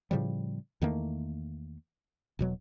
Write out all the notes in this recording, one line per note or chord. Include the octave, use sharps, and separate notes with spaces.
A2 C#3 F3 G3
E2 D#3 A3 A#3
E1 B2 F#3